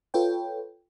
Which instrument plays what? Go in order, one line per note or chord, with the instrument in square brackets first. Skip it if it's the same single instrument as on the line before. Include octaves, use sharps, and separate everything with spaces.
[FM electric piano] F4 A4 B4 C#5 G5